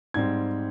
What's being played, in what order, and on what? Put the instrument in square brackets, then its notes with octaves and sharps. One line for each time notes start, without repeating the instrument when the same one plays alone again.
[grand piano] G#2 G3 C4 G#6